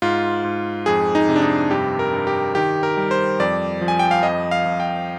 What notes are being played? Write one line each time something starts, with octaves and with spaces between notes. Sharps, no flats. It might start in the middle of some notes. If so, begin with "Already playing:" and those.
G#2 F4
G#2
F2 G#4
D#4
C3
D4
D#4
G2 G4
A#4
G2
G4
D#3 G4
A#4
G3
C5
F2 D5
F3
G#5
G5
F5
F2 D#5
F5
F2
G5